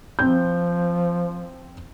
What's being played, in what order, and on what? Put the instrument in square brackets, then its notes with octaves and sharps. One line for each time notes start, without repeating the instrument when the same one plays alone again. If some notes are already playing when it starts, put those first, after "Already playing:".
[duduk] F3 [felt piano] C4 G6